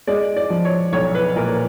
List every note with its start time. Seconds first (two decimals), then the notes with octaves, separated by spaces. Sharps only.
0.07 G#3 D5
0.36 D5
0.50 F3
0.65 C#5
0.93 B1 C#5
1.15 B4
1.36 A#2 A#4